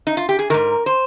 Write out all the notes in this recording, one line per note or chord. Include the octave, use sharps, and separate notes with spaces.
D#4
F4
G4
G#4
G#2 D#3 A#4
C5